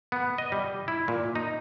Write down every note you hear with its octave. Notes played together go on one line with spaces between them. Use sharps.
B3
D#5
G3
E4
A#2
D#4